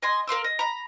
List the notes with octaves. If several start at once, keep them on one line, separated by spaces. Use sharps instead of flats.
D#5 G#5 C6
A#4 F5 C6 E6
D#5
A#5 B5